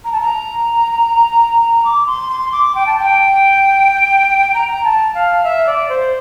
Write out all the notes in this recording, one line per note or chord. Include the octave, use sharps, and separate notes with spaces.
A#5
A5
A#5
D6
C6
C6
D6
G5
A5
G5
A#5
A5
F5
E5
D5
C5